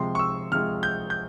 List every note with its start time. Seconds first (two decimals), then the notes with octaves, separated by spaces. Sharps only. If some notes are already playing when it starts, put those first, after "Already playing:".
Already playing: C3 F3 G#3 C6
0.15 C#6
0.19 E6
0.52 C3 F3 G#3 F6
0.83 G6
1.10 G6